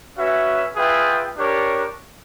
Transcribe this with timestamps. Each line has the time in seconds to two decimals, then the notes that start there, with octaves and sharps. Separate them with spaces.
0.16 C#4 F#4 B4 E5
0.76 F4 G#4 B4 E5 G5
1.36 D4 G4 A#4 C#5